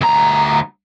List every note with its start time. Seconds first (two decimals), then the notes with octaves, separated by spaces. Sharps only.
0.01 D2 A#5